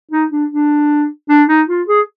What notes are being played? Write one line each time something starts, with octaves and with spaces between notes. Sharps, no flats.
D#4
D4
D4
D4
D#4
F4
G#4